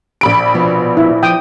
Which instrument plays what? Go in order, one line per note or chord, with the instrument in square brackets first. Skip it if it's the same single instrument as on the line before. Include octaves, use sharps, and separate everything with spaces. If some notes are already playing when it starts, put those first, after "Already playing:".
[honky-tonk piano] A#1 B5 D7
[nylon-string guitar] B2 F3 B3
[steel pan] E4
[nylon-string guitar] F3 [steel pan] G5 D#6